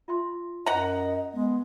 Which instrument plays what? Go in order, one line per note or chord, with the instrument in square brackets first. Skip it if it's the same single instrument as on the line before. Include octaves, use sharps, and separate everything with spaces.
[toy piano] F4 E5 C6
[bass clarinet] F#2 [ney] D#5 [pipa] F#5 A#5
[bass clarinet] G#3 [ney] B3